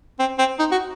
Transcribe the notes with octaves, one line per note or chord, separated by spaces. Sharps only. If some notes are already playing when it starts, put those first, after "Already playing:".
C4
C4
D#4
F#4